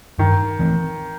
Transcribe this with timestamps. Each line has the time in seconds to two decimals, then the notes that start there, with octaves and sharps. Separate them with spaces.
0.19 G2 D#3
0.59 E3 A3 C4